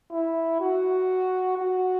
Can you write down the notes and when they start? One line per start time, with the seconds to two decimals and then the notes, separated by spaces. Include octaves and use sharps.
0.11 E4
0.60 F#4
1.57 F#4